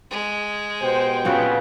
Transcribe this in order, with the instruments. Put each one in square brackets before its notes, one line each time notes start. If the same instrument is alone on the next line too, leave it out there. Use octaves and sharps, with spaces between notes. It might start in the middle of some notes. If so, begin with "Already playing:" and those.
[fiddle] G#3
[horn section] B2 G4 G5 [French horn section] C5
[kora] A#2 C4 F#4 [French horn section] C#3 B3